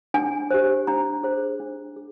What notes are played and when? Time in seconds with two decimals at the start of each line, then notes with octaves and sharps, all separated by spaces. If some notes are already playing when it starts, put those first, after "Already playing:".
0.14 D4 G#5
0.51 G4 C5
0.87 D4 A#5
1.23 G#4 C5
1.60 D4
1.96 G#4